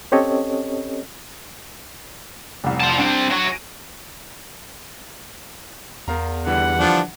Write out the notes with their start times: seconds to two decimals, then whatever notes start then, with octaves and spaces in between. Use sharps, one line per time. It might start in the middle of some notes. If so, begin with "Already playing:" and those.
0.12 C4 C#4 G4 A4 C#5 D#5
2.64 F1 C2
2.80 F4 A5
2.98 G3 C4 D4
3.30 F#3 F#4
3.44 A#6 D7 D#7
6.08 E2 A#4 F5 A#5
6.46 D3 E3 G3 F#5
6.77 F3 D4